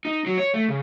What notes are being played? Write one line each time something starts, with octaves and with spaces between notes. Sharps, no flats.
D#4
F#3
C#5
A3
C#3